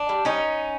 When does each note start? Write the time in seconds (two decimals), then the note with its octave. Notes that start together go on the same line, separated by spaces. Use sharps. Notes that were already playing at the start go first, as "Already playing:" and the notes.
Already playing: D4
0.09 G3
0.25 G3 C#4 D#4